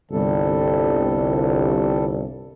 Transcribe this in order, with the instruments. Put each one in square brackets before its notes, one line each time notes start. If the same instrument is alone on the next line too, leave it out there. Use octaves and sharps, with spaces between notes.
[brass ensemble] G1 C2 [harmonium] G3 A4